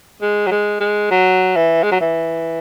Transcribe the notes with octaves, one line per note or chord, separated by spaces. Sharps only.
G#3
F#3
G#3
G#3
F#3
E3
G#3
F#3
E3